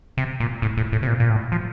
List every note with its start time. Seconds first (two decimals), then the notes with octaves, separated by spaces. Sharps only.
0.17 C3
0.40 A#2
0.62 A2
0.77 A2
0.92 A2
1.03 C3
1.07 A#2
1.20 A#2
1.30 A2
1.52 F3